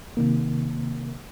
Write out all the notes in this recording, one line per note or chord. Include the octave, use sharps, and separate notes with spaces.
C3 D#3 A#3